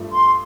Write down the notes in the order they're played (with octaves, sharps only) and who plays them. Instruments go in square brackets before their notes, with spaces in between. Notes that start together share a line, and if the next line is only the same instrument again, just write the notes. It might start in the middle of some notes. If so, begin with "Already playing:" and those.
Already playing: [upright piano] G2 F3 A3
[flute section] C6